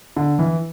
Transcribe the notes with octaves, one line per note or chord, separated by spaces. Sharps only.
D3
E3